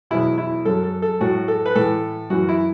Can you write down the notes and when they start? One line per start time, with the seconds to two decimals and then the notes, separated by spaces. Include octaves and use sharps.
0.11 E2 B2 F#3 E4
0.38 E4
0.65 F#2 F#3 A4
0.83 A4
1.02 A4
1.21 A2 F#3 F#4
1.48 A4
1.66 B4
1.75 A2 E3 A4
2.30 F#2 E3 F#4
2.49 E4